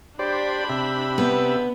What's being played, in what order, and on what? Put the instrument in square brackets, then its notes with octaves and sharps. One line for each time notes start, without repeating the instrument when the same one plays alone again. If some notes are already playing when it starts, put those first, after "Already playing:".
[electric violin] D4 B5 [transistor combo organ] G4 C5 D5
[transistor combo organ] C3 G4 E5
[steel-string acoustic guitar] B3